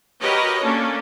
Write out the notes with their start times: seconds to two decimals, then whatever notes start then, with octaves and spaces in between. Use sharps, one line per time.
0.22 F#4 G4 A#4 B4 C#5 D#5
0.63 A#3 C#4 D4 A4